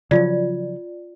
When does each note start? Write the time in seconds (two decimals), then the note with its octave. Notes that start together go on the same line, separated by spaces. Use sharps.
0.11 C#3 F3 F#3 F4 D5